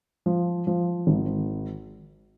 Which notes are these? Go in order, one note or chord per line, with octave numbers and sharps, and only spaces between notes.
F3
F3
G#1